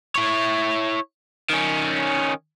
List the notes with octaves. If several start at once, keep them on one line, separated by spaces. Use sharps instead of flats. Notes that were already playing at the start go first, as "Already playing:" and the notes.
E4 C#5
D#3 C#4